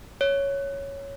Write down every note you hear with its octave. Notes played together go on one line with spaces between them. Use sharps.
C#5